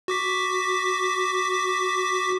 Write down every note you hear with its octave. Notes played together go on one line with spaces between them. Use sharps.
F#4 D6 B6